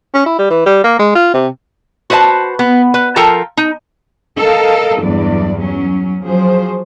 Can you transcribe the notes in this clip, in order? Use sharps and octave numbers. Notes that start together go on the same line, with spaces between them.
C#4
E4
G3
E3
G3
A#3
G#3
F4
C3
F#4 B4 C5 D#5 A5
B3
B4
F3 F4 A4 A#4 G5 A#5
D#4
A4 A#4 D#5 F5
E2 G2 F#3 D5
F#3 C#4
F3 F#3 G#4 C5